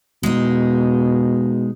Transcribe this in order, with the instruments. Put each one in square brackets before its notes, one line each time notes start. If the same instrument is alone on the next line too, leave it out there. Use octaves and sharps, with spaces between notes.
[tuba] B2 [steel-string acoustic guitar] G#3 D#4